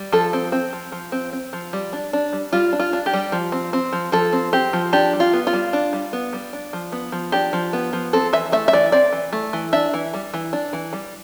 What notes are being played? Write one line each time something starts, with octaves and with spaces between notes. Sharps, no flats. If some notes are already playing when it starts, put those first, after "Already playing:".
Already playing: G3
F3 A4
C4
C4
F3
F3
C4
C4
F3
G3
D4
D4
G3
G3 F4
D4
F4
D4
G4
G3
F3
C4
C4
F3
F3 A4
C4
C4 G4
F3
D4 G4
G3
F4
B3
F4
G3
D4
G3
B3
G3
D4
F3
B3
F3
D4 G4
F3
B3
F3
C4 A4
E3 E5
A3 E5
E5
E3 D5
C4 D5
E3
A3
E3
D4 E5
E3
G3
E3
D4
E3
G3